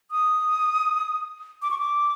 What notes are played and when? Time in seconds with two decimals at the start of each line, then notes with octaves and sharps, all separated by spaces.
0.11 D#6
1.62 D6
1.71 C#6
1.79 D6